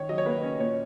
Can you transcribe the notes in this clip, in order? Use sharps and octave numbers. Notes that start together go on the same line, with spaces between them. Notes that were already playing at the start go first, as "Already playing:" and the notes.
Already playing: D#3 C#5
F#3 D#5
C#5
A#3 B4
C#4
A#2 C#5